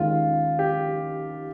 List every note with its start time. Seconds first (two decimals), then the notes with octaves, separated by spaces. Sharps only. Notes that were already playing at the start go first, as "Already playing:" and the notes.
Already playing: D#2 D#3 G#3 C#4 F4
0.59 G4